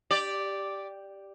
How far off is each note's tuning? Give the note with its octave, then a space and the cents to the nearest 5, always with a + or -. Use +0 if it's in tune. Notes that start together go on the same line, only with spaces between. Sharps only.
G4 +0 D5 +0